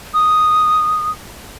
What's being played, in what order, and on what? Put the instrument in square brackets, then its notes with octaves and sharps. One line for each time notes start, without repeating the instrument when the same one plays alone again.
[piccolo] D#6